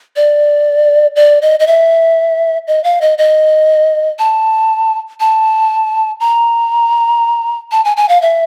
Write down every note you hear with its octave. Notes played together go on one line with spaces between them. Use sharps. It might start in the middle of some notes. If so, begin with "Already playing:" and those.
D5
D5
D#5
D#5
E5
D#5
F5
D#5
D#5
A5
A5
A#5
A5
G#5
G#5
F5
E5